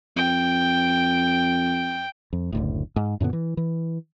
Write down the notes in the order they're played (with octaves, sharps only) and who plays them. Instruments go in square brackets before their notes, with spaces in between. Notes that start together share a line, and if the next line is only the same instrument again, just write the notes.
[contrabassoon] F2 [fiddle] G5
[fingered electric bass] F2
F#1 D2 A2
G#2
F#2 A#2 D3 B3
E3
E3